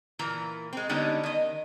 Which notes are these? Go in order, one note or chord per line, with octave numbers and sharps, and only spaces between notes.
A#2 E3 A#3 A#5
G#3 C4
D3 G3 G#3 B3 C#4 D#4
D#3 D#5